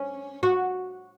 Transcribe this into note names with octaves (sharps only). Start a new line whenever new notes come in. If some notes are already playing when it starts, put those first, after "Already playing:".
Already playing: C#4
F#4